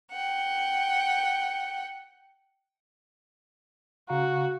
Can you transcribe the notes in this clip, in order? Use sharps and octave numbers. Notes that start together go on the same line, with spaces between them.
F#5 G5
C#3 F#4 F5 A#5